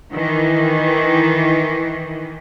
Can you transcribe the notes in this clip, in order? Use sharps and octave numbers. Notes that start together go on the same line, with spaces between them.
D#3 E3